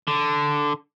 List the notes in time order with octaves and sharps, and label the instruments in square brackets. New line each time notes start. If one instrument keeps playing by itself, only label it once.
[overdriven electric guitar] D3